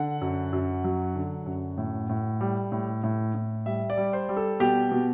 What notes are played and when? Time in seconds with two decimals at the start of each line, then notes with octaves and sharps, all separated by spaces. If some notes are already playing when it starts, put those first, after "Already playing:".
Already playing: D3 F#5
0.21 F#2
0.53 F#2
0.84 F#3
1.15 D3
1.46 F#2
1.78 A2
2.09 A2
2.41 G3
2.72 A2
3.04 A2
3.35 A2
3.66 G3 E5
3.90 D5
3.98 G3
4.13 C5
4.29 G3
4.37 A4
4.60 B2 G4
4.92 B2